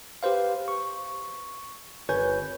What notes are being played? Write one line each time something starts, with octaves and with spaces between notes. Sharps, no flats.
G4 B4 C5 F5
C#6
G1 B4 C#5 G#5 G6